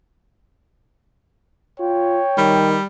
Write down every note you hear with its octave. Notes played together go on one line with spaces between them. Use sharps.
F4 C#5 G5
D#3 G3